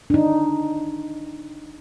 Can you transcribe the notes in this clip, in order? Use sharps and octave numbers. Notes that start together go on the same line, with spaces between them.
D4 D#4